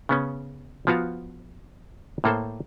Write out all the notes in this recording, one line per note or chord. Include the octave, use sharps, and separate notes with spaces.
C#3 B3 C#4
F3 B3 F4 F#4 F5
A2 A#3 A4 C5